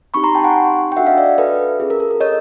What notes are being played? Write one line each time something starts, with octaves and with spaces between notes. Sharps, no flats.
C4 D#4 G4 B5 C#6
A#5 C6
G5 A5
F#5 G#5
G5
D4 F#4 A4 E5 F#5
D#5 F5
D5 E5
A4 B4
C#4 F4 G#4
A#4
A4
A#4
C#5 D#5